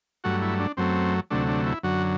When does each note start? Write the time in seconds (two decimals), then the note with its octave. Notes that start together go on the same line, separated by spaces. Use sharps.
0.24 G2 F#3 A3 F#4
0.42 E4
0.60 D4
0.77 F#2 F#3 A3 C4
1.30 D2 C3 F#3 A3 D4
1.49 D4
1.66 E4
1.83 F#2 D3 F#3 F#4